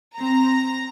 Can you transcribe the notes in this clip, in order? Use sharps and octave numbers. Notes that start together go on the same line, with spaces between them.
C4 A#5